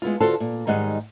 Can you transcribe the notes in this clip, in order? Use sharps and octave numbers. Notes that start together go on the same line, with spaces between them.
G#3 B3 E4 F4
D3 F4 F#4 A4 C5 A5
A#2
G#2 D#3 G3 D#4 G#4 F#5